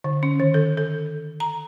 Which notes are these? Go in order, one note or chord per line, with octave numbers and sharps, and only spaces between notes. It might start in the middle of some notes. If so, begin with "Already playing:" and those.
D3
C#4
D#3
A4
A4
A#5